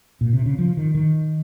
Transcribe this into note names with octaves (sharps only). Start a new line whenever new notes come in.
A#2
C3
C#3
F3
D#3
D#3